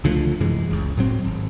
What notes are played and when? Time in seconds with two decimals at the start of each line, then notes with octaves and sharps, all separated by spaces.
0.04 C#2 D3 F3 A3
0.40 F#2 C3 E3 G#3
0.70 F#1 C#2
0.97 A2 F#3 C4
1.24 G#1